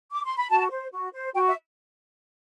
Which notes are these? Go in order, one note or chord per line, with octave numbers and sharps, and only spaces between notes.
D6
C6
B5
F#4 A5
C5
F#4
C5
F#4 G5
E5